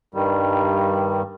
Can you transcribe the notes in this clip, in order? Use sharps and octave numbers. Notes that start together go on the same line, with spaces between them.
G2 D#3 G3